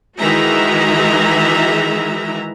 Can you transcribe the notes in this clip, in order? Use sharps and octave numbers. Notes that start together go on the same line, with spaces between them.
D#3 E3 G#3 F#4 E5 A#5